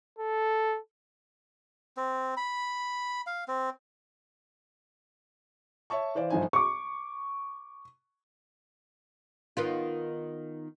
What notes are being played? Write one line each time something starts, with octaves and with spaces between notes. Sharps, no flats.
A4
C4
B5
F5
C4
C#5 E5 A5 C#6
E3 C5 D5 F5
G1 D3 F3 D#4 C5 G#5
C#6 D6
D#3 B3 F4